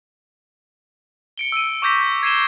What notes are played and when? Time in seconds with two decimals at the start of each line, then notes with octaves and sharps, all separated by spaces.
1.38 C#7 D7 G7
1.52 E6 D#7
1.82 C#6 D6 E6 G6 A#6 B6
2.23 G#6 C7 D#7 E7 G7